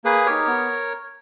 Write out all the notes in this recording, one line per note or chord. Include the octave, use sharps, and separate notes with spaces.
A#3 G#4 B4
D#4 G4 A#4 C#5
B3